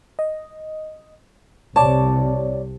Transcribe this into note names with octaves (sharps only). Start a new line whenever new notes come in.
D#5
C2 C3 C#5 D5 A5